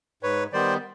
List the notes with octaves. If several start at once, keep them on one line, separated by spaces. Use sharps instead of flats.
G#2 B4 C#5
D#3 G3 B3 C5 D5